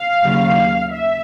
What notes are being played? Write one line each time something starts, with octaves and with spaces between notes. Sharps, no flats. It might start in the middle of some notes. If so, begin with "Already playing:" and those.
Already playing: F5
D#2 C#3 F#3
E5